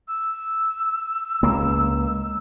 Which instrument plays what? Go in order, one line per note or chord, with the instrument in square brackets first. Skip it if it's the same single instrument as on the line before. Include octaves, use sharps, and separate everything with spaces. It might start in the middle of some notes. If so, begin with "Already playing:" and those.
[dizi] E6
[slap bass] C#2 A#3